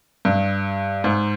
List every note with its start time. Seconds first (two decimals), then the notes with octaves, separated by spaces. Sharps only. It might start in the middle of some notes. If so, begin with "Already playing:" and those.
0.25 G2
1.04 G#2